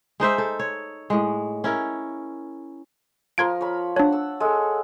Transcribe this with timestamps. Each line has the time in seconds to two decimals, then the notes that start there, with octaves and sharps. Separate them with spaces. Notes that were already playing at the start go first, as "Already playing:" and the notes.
0.20 G#3 D#4 C5 E5
0.38 A4
0.59 C#5
1.10 A2 G#3
1.64 C#4 E4 A#4
3.38 F3 A#4 C6 G#6 D7
3.61 C#5 B5
3.96 D4 C#5 F#5 A5
4.12 E6
4.40 G#3 A4